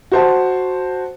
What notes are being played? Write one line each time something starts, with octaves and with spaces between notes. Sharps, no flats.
F#4 C5 A5